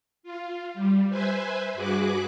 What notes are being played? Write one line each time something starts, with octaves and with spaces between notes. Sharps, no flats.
F4
G3
B4 C5 E5 G#5
G2 F#4 G#4 B4 D6 F#6